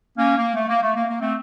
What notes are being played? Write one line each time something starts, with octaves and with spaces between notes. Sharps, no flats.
A#3 C#4
A#3
A3
A#3
A3
A#3
A#3
A3 C4